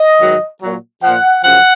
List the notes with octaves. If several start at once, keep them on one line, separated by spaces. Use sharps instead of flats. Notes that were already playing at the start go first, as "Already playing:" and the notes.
Already playing: D#5
G#2 D#3 F#3
A#2 F#3
A#2 F3 F#5
F#2 C#3 F3 F#5